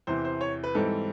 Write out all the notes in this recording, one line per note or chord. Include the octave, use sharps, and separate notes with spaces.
E2 C3 E3 C5
C5
C#5
B4
G#2 E3 G3 C4 A4